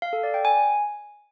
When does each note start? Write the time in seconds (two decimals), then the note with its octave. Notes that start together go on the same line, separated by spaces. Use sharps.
0.02 F5
0.13 A4
0.23 D5
0.34 G5
0.45 G#5